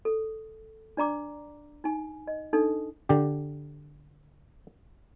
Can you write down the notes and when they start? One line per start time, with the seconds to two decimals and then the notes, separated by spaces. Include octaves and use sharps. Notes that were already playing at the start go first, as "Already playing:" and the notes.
0.05 A4
0.97 D4 D5 A#5 D6
1.84 D#4 G#5
2.27 D#5
2.53 D4 D#4 A4
3.09 D3 G4